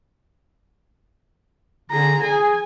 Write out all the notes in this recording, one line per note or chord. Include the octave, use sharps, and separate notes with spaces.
D3 G#4 A#5
G#4 G#5